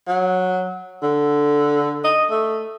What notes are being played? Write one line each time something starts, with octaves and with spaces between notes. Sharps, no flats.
F#3
D3
D#5
A3